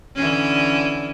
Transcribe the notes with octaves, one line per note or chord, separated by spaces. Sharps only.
D3 E3 C#4